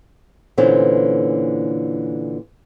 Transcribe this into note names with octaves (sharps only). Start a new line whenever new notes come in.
A#2 D3 E3 B3 C#4 C5